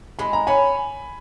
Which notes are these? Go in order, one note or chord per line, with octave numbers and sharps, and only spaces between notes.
G#3 B5
A#5
C#4 G#5 B5